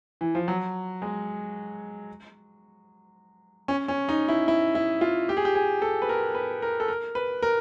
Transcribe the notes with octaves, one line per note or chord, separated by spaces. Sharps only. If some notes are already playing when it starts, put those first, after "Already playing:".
E3
F3
F#3
G#3
C#4
C#4
D#4
E4
E4
E4
F4
G4
G#4
G4
G#4
A4
B4
A#4
B4
A#4
A4
A#4
B4
A#4